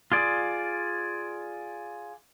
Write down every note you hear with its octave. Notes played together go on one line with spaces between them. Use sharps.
F4 G#4 D5